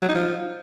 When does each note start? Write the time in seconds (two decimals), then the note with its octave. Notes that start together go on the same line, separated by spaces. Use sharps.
0.02 F#3
0.09 D#4
0.15 F3